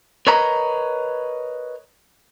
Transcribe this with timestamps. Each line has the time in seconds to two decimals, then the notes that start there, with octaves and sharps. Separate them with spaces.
0.27 A#4 B4 C#5 D#5 A#5